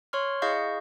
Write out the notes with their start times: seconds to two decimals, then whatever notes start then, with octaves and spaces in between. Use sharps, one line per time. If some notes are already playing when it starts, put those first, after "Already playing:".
0.13 C#5 C6 C#6 F6
0.42 E4 G#4 D#5 F5 C#6 G6